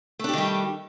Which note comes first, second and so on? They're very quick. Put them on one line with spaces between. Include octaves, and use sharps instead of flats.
A3 D4 G4 D#3 G3